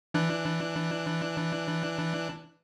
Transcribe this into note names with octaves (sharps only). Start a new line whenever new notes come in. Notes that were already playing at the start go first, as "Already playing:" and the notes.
E3 D4 F#6